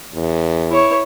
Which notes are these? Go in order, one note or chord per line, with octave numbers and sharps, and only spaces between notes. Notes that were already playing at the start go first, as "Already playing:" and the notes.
E2
E4 C#5